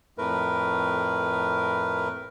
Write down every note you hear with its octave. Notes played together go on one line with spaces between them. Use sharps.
F2 A2 A3 A#4 B4